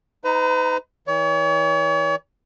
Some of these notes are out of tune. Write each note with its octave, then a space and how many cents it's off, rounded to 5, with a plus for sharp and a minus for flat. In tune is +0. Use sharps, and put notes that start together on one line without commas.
D#4 +20 B4 +45 A#5 -5
E3 -40 C#5 +40